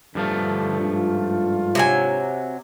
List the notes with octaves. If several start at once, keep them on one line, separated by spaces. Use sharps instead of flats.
G2 D3 F3 A3
G#2 D4 F4
C3 F#3 G#5